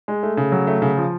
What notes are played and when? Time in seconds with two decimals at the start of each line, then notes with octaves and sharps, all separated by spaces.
0.08 G#3
0.23 A3
0.37 C#3
0.52 F#3
0.67 A3
0.82 C#3
0.97 F3